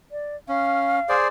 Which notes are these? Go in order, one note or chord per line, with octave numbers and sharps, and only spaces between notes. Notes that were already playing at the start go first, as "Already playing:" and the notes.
D5
C#4 F5
G#4 C5 D5